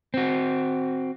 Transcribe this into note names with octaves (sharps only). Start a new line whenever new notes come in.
C4 F#4